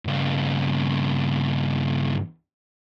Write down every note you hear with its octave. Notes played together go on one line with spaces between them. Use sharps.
G2 C#3